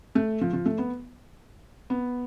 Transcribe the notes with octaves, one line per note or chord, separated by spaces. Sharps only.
A3
F3
F3
A3
B3
B3